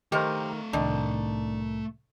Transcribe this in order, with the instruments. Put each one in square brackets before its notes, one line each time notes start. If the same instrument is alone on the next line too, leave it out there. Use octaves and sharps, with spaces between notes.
[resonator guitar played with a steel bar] D#3 A#4 [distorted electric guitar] A3 F5 [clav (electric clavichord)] G4 C5
[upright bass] C2 A2 [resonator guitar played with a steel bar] D#3 [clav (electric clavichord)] D4